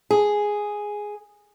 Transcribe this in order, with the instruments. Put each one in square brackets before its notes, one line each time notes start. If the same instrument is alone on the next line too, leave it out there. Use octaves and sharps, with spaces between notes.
[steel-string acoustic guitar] G#4